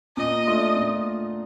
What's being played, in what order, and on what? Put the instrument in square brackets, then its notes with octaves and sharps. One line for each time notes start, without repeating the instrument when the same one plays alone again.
[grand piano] A#2 [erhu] D#5
[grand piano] A3 D4 F4
A#2